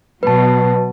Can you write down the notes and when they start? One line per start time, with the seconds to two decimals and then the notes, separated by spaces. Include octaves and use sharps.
0.23 B2 F#3 B4 A5